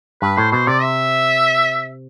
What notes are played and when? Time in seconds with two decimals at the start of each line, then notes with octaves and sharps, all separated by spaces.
0.22 G2 B4
0.37 A2 C5
0.52 B2 C5
0.67 C3 D5
0.82 E5